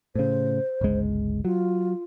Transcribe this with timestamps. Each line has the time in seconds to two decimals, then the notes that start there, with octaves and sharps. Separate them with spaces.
0.15 A2 C#3 C5
0.81 G1 C#2 G#3
1.45 F#3 F4